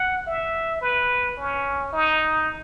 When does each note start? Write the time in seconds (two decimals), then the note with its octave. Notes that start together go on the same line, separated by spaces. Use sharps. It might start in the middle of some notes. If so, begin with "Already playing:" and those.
Already playing: F#5
0.27 E5
0.82 B4
1.37 C#4
1.93 D#4